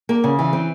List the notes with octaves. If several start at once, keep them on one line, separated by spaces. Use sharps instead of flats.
A#3
C#3
E3
C4